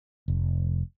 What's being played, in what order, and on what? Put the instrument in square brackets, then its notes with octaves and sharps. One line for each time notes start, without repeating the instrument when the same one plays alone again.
[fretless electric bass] F1